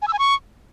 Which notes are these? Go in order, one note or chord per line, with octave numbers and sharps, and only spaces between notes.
G#5
E6
G#5
C#6